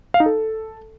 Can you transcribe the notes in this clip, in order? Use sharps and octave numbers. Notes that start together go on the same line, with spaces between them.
F5
D#4
A4